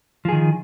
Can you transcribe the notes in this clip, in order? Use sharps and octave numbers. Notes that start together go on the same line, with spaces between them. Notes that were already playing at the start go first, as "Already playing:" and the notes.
D#3 F3 G#4